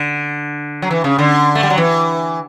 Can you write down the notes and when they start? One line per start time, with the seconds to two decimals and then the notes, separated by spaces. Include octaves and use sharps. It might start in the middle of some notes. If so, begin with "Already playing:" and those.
Already playing: D3
0.82 F#3
0.91 E3
1.04 C#3
1.19 D3
1.55 A3
1.63 G3
1.70 F#3
1.78 E3